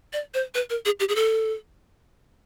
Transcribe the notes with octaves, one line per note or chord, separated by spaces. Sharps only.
D5
C5
B4
A#4
G#4
G4
G#4
A4